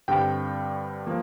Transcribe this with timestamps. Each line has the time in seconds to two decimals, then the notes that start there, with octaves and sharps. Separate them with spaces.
0.08 G2 D3 G3 C4 G5
1.07 F3 A#3